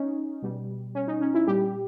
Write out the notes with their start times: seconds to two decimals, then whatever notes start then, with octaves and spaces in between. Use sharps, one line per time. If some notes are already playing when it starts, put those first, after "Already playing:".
Already playing: C#4 D#4
0.42 B2 G3
0.95 C#4
1.08 D#4
1.21 C#4
1.34 E4
1.47 A#2 G3 G4